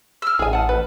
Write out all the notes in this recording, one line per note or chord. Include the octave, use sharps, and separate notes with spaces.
E6 F6
A1 G#4 G#5
F#5 A5
B4